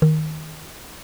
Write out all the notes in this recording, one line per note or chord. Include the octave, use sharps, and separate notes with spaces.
D#3